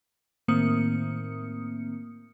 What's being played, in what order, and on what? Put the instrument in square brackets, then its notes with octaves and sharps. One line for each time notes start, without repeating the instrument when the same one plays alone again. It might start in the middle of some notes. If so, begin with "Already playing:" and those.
[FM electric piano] A2 D#3 A#3 C4 D#6 C#7